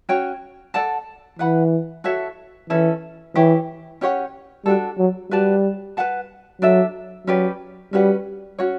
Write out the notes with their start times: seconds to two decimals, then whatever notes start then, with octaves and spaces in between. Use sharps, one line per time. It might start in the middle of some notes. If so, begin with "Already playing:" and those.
0.09 C#4 F#4 C#5 G5
0.74 A4 D5 F#5 A5
1.39 E3 B4 F#5 B5
2.04 F#4 A4 C#5 E5
2.70 E3 C#4 E4 A4
3.35 E3 E4 G4 C#5
4.01 C#4 G4 C#5 F#5
4.65 G3 D4 F#4 A4
4.98 F#3
5.31 G3 F#4 B4 D5 A5
5.97 B4 F#5 A5
6.62 F#3 D4 A4 E5
7.27 F#3 C#4 G4 B4 D5
7.93 G3 C#4 F#4 B4 F#5
8.59 C#4 F#4 C#5